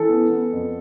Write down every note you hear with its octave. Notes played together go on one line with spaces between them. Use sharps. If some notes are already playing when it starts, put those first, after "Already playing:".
Already playing: E3 A4
B3
B3
F2